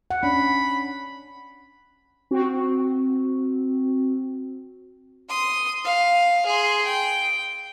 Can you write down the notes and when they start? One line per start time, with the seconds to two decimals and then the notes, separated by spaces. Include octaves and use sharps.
0.10 F#5
0.23 C#4 D4 B5
2.31 C4 F#4
5.29 C6 D#6
5.85 F5
6.46 G#4 C6
6.86 G5